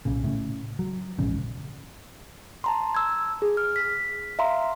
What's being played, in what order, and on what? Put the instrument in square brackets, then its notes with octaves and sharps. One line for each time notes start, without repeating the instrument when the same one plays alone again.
[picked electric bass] B1 A#2 C#3
A2 C#3
F#3
A#1 E2 G#2 C#3
[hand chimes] A5 A#5 C6
E6 G#6
G#4
F6
B6
E5 F5 A#5 C6